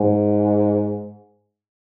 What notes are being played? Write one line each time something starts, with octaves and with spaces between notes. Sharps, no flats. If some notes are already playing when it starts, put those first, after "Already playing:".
Already playing: G#2